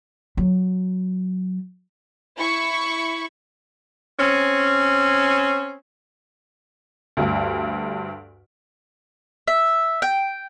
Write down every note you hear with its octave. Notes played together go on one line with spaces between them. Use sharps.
F#3
E4 B5 C#6
C4 C#4
D2 G2
E5
G5